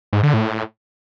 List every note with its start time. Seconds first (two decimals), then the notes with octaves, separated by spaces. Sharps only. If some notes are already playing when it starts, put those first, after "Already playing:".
0.13 G#2
0.23 D3
0.34 A2